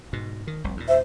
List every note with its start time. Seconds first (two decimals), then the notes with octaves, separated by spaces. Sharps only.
0.13 G#2 B2
0.47 D#3
0.64 F1 C2
0.77 D#2 A#2
0.88 C5 E5